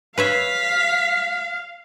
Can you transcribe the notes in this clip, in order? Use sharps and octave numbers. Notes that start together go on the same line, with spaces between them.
B4 C#5 E5 F5 B6